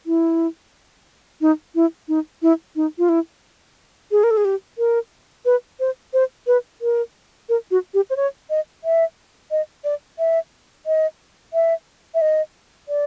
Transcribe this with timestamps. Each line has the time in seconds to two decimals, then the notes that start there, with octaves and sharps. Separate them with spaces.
0.06 E4
1.41 D#4
1.75 E4
2.08 D#4
2.42 E4
2.76 D#4
2.98 F4
3.09 E4
4.11 G#4
4.24 A#4
4.31 A4
4.37 G#4
4.45 G4
4.78 A#4
5.45 B4
5.80 C5
6.13 C5
6.47 B4
6.81 A#4
7.49 A#4
7.71 F#4
7.94 G4
8.10 C5
8.16 C#5
8.50 D#5
8.84 E5
9.51 D#5
9.84 D5
10.19 E5
10.86 D#5
11.53 E5
12.14 E5
12.21 D#5
12.89 D5